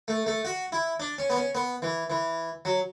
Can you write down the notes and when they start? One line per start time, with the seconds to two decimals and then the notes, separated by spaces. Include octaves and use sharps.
0.08 A3
0.26 A3
0.45 F#4
0.72 E4
1.00 D4
1.18 C#4
1.30 B3
1.36 C#4
1.55 B3
1.82 E3
2.10 E3
2.65 F#3